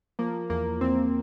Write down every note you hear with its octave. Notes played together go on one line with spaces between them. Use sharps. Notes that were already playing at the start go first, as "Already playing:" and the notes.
F3 A#3
E2 A#3
E2 C4